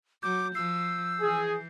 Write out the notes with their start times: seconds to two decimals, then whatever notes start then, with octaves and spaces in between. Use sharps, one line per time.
0.23 F#3 D6 G6
0.55 F3 E6 C7
1.21 E3 G#4